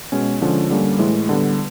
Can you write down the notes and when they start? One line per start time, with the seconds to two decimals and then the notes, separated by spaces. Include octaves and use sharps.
0.12 B2 G#3 C#4
0.41 D3 F3 G#3 C#4
0.71 D3 G3 A#3 C#4
0.99 A2 E3 G#3
1.29 D3 G3 B3